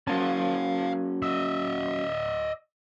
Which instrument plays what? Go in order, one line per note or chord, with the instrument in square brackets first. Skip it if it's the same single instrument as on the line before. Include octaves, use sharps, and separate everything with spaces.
[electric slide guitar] F#3 A#3 C#4 [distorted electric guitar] F5 A5
[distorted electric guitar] D#5 E5